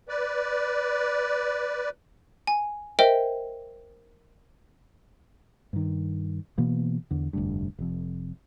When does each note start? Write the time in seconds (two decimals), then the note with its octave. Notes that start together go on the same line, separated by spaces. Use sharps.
0.09 B4 D5
2.47 G#5
2.99 A#4 C5 D#5 E5 G5
5.73 G2 D#3
6.58 B2 E3 A#3 B3
7.11 E2 D3
7.33 F1 D2 G2
7.79 F1 F2